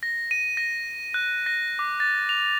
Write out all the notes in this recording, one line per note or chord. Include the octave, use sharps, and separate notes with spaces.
A#6
D#7
A#6
F#6
A#6
D6
A6
F7